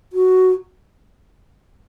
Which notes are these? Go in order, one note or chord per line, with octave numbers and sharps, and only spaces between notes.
F#4